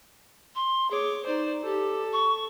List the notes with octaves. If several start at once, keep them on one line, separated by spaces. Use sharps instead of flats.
C6
G#4 C#5 D6
D#4 C5 D5
G4 A4
C#6